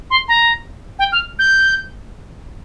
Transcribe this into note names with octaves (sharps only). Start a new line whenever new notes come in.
C6
A#5
G5
F6
G6